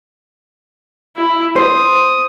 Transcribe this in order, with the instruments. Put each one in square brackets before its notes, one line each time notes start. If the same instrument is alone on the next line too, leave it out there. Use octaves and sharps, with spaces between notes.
[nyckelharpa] E4
[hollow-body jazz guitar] C5 [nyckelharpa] D#6